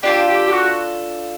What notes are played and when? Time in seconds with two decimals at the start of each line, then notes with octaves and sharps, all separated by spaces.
0.03 D4 F4 G4 A4
0.27 G4
0.47 G4
0.52 F#4